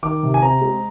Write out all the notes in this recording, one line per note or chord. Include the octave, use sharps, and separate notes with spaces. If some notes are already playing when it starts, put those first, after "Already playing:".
D#3 D6
C3
G#5
C4 A#5
G#3